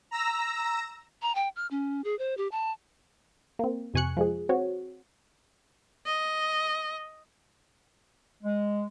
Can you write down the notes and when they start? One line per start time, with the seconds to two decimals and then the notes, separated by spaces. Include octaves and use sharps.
0.11 A#5 E6 A#6
1.22 A#5
1.35 G5
1.56 F6
1.71 C#4
2.04 G#4
2.19 C5
2.37 G4
2.52 A5
3.59 A#3 C4
3.94 F2 C3 G#5 C#6 F#6 C#7
4.17 F3 G#3 G#4
4.49 C4 F#4 C#5
6.06 D#5
8.43 G#3